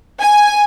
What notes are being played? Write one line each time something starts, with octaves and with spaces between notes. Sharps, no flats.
G#5